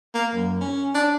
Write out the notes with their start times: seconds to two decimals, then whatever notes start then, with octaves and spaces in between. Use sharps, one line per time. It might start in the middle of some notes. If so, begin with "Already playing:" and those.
0.14 A#3
0.35 F#2
0.61 C#4
0.94 D4